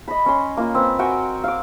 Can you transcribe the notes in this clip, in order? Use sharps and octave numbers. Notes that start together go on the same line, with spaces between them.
D#5 B5
C#4 C6
A#3 F4
C4 B4
F#4 A#4 G5 G#5
F5 D6